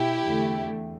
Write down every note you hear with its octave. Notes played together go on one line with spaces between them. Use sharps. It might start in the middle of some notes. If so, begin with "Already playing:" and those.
Already playing: B2 E4 G4
E2 D3 A3
E2